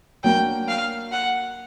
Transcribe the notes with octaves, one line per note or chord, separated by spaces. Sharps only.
F#3 A#3 D4 G5
F5
F#5